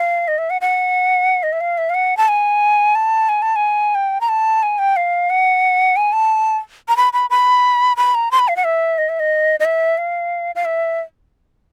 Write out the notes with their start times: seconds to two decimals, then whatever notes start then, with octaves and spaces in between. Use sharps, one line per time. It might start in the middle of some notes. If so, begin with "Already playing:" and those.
Already playing: F5
0.28 D#5
0.38 E5
0.50 F#5
0.61 F#5
1.43 D#5
1.53 E5
1.61 F5
1.78 E5
1.90 F5
1.95 F#5
2.17 A5
2.28 G#5
2.95 A5
3.29 G#5
3.42 A5
3.56 G#5
3.95 G5
4.21 A#5
4.29 A5
4.63 G#5
4.79 G5
4.96 F5
5.30 F#5
5.96 G#5
6.13 A5
6.88 A#5
6.97 B5
7.13 B5
7.30 B5
7.97 B5
8.15 A#5
8.31 C6
8.39 B5
8.48 F5
8.56 F#5
8.64 E5
8.98 D#5
9.09 E5
9.20 D#5
9.60 D#5
9.65 E5
9.98 F5
10.55 F5
10.65 E5